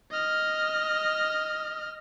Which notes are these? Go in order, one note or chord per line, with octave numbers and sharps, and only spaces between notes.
D#5 F6